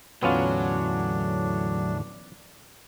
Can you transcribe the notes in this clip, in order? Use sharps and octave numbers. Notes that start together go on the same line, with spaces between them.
E2 A2 D3 F#3 B3 C#4 D4 F4